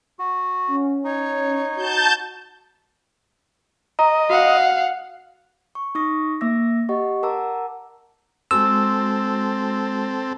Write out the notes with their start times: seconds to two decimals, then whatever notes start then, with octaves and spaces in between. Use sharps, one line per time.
0.19 F#4
0.68 C#4
1.04 D#4 C#5
1.76 F#4 A5 G6
3.99 D#5 A#5
4.30 F#4 F5 F#5
5.75 C#6
5.95 D#4 C#6 D#6 A#6
6.41 A#3 E5 D6 E6 A#6
6.89 G4 D#5 F#5 C#6
7.23 A#4 F#5 A5 A#5 D6 E6
8.51 G#3 C4 F#4 A4 C6 E6